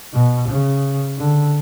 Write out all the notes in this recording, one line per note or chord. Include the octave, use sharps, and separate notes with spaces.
B2
C#3
D3